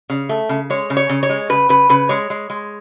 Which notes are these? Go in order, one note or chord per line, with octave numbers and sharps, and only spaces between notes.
C#3
A3
C#3
G#3 C#5
C#3
C#5
C#3
C#5
G#3
C#3 B4
C#3 B4
C#3 B4
G#3 C#5
G#3
G#3